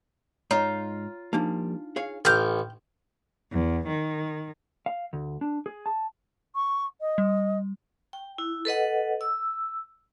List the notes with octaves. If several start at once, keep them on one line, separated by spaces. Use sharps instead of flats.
G#2 D#4 F4 C#5 A#5
F3 G3 A#3 D4 D#4
G#4 C#5 F5
A1 G5 F6 G6
E2
D#3
F5
D2
D4
G#4
A5
C#6
D#5
G3
G5
E4
A4 B4 D#5 F#5
E6